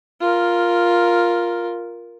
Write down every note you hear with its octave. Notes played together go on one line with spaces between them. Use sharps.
F4 A#4